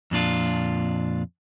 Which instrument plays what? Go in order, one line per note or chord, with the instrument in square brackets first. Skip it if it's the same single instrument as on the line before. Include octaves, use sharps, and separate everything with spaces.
[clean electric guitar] F2 A#2 D4 F4